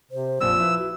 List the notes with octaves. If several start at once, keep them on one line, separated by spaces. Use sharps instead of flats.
C3 C5
A#1 F2 A#2 F3 E6
E4 B4
F#4